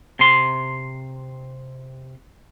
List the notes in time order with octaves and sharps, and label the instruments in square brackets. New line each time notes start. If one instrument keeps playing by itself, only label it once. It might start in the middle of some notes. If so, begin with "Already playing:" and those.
[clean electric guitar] C3 C6